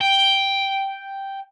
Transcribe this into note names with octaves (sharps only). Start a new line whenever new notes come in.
G5